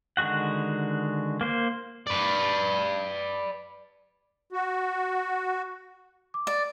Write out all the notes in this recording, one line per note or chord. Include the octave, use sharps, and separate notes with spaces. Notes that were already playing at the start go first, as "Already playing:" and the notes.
D3 D#3 G#3 F#4 F#5
A#3 C5
B4 D5
F#4
D6
D5